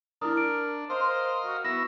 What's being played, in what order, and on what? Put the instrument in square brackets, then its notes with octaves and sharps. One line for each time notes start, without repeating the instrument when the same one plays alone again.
[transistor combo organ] D4 [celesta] E4 D#6 [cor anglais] A#4
[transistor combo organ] D4 [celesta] D7
[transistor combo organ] A#4 D#5 F5 [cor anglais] C5
[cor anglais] C5
F#4
[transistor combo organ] B3 E4 E6 [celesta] A#6